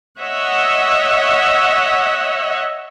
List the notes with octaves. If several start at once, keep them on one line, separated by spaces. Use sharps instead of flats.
C#5 D#5 E5 F#5